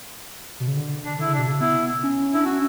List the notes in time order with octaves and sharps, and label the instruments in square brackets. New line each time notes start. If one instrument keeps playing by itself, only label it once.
[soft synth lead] B2
C#3
D3
[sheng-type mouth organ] D4
[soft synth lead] D3 [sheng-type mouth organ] E4
[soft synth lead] C#3
[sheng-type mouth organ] D4
[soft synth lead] B2
C#3
[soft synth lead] B3 [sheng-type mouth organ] E4
[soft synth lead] C#4
[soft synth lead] D4 [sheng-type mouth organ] E4
[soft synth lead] C#4 [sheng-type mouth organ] F#4